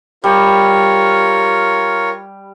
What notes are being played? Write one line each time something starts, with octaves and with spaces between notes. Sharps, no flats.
G3 F4 A#4 C#5